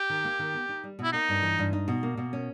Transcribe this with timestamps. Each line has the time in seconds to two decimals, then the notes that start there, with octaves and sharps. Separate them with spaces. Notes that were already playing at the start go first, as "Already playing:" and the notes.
Already playing: G4
0.10 D#3
0.24 A#3
0.39 D#3
0.54 B3
0.69 D#4
0.84 G3
0.99 B2 E4
1.13 A#3 D#4
1.29 G2
1.43 E3
1.59 G2
1.73 D#4
1.88 B2
2.03 A#3
2.17 B2
2.33 C#4